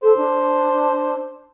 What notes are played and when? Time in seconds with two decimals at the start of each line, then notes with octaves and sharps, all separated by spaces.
0.03 A4 C5
0.16 D4